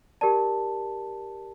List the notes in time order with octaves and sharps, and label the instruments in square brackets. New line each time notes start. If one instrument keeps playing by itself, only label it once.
[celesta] G4 A#4 D5 A5